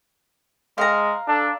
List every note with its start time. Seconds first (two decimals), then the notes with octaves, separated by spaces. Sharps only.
0.78 G#3 F5 A#5
1.28 D4 A4